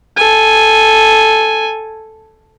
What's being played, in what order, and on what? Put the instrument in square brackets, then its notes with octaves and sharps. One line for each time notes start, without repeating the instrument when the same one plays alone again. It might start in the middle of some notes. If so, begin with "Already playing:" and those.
[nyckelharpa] A4 G#5